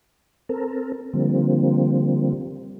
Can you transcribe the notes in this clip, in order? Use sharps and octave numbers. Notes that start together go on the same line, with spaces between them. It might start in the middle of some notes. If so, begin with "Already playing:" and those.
C4 A4 A#4
D3 F3 G3 A#3 C4